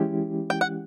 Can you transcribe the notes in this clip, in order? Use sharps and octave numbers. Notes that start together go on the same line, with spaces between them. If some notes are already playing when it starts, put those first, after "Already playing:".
Already playing: E3 G#3 C#4 E4 G4
G5
F#5